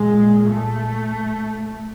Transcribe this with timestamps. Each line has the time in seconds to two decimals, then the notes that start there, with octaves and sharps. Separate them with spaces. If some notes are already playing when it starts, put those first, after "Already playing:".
Already playing: A#2 G#3
0.48 A3